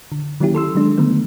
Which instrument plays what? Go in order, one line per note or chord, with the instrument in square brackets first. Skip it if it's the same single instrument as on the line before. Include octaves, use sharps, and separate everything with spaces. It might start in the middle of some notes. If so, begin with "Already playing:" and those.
[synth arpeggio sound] D3
D#3 F#3 A#3 C#4 E4 G4
A4 C6 E6
D#3 F#3 G#3 D4
D3 D#3 G3 A3 B3